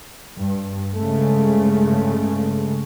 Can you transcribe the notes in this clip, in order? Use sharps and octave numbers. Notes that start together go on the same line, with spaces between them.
G2
G2 C#3 G#3 A3